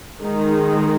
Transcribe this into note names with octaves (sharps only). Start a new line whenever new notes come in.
D#3 G#3 D#4